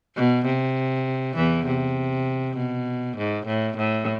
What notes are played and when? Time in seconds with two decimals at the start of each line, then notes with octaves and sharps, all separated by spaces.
0.16 B2
0.46 C3
1.36 E2 E3
1.66 C3
2.57 B2
3.17 G#2
3.47 A2
3.77 A2